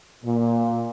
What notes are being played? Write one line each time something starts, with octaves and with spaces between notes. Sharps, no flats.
A#2